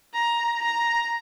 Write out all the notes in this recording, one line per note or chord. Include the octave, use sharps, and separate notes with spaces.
A#5
A#5